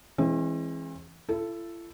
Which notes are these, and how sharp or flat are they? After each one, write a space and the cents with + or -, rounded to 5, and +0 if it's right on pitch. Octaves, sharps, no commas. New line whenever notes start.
E3 +5 G#3 +0 C4 +45
E4 +45 A4 +0